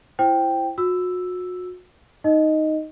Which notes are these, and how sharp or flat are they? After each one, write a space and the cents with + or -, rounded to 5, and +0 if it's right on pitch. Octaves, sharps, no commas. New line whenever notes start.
E4 +20 C5 +0 G5 +0
F#4 -35 E6 +0
D#4 +0 D#5 +0